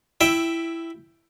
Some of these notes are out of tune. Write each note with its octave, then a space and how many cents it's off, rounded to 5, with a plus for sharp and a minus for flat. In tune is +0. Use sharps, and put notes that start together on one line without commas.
E4 +10 E5 +0 G5 +0